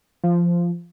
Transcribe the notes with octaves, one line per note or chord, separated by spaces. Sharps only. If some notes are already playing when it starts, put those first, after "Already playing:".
F3